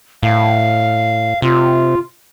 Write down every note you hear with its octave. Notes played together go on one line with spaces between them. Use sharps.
A2 F5
C3 F4